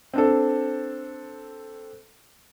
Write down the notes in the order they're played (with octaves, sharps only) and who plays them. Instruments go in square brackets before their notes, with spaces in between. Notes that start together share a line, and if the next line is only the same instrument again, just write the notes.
[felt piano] C4 D4 A4